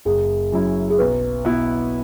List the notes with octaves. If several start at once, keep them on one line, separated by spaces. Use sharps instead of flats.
F#1 G#4
F#2 F#3 C#4 E4
G#4
B1 B4
B2 B3 E4